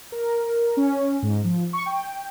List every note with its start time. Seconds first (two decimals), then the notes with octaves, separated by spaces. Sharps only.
0.12 A#4
0.77 C#4
1.23 G#2
1.44 F3
1.73 C#6
1.86 G5